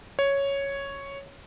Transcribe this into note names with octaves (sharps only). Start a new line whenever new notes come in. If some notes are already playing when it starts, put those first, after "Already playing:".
C#5